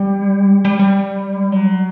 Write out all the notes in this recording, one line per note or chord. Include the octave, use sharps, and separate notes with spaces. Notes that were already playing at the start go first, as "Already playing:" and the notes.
Already playing: G3
G3
G3
F#3